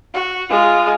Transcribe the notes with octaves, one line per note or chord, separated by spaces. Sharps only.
F#4
G#3 F4